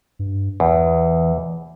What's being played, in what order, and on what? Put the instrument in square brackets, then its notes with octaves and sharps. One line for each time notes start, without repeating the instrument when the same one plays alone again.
[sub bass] G2
[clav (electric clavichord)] E2 [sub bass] E3